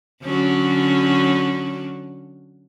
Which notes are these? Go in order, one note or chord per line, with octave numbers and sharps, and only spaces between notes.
D3 F#3 C#4